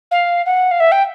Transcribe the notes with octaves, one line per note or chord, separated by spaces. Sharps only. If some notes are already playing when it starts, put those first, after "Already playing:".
F5
F#5
F5
E5
G5